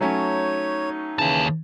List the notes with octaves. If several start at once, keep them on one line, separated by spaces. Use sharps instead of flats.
F#3 A3 C#4 D#4 C#5
D#2 C#3 E3 A5